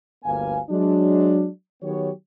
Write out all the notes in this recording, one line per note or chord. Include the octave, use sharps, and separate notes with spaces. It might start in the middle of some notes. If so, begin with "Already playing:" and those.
G1 D2 A#3 B4 F5 G#5
F#3 G#3 D4
D#3 F#3 B3 G4 C#5